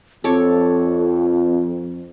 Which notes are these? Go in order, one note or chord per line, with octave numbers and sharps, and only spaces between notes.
F2 C4 A4 C#5 D6